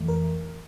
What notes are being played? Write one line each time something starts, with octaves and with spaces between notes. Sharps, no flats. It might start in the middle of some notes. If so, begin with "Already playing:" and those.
Already playing: F2 E3 A3
A#4